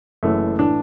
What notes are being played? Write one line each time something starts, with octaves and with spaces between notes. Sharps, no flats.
F#1 F#2 E3 A3
A2 E3 D4